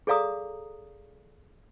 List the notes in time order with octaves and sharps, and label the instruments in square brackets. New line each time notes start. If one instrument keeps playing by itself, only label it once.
[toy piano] G#4 A4 D5 F5 A#5 D#6